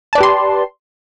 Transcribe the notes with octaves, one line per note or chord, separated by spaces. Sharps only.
G4 B4 D5 A5 C6